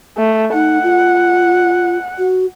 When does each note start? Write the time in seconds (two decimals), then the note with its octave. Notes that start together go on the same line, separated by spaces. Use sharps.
0.18 A3
0.53 D#4 F#5
0.83 F4
2.18 F#4